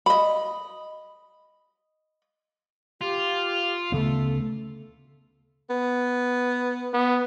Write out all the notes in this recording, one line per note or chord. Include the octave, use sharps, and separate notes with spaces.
D#5 B5
F4 G4
D2 C#3 A3 B3 A4
B3
B3